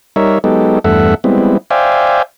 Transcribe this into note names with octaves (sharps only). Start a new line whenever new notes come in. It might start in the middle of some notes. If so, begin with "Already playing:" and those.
G3 D#4 A#4 C#5 E5
F#3 G#3 B3 D#4 G4 A4
E2 G2 A3 A4 E5 F#5
G3 G#3 B3 C4 E4
C5 D5 E5 F5 G5 G#5